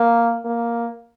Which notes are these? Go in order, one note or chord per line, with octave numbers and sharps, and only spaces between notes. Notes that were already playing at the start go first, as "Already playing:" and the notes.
Already playing: A#3
A#3